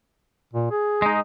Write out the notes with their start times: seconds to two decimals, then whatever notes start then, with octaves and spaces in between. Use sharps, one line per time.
0.53 A#2
0.71 G#4
1.02 G#3 D#4